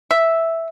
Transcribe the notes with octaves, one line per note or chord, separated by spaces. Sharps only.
E5